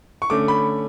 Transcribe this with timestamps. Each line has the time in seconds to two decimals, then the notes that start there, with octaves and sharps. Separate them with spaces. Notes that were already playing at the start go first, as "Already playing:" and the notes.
0.22 C#6
0.30 D3 A3 C#4 D6
0.48 B5